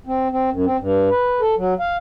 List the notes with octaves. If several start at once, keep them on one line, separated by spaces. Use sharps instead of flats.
C4
C4
F#2
C4
G2
B4
A4
F#3
F5